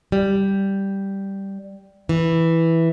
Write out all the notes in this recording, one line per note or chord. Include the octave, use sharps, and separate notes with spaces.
G3
E3